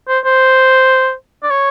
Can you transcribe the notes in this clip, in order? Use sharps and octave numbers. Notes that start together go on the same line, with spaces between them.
C5
C5
D5
C#5